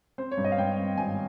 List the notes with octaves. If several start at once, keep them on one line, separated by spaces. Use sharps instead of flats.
C4 C5
C#5
G2
D#5
F5
G2 G5
C4
G#1 G#5